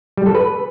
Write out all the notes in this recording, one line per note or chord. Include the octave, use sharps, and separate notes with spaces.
G3
A4
B4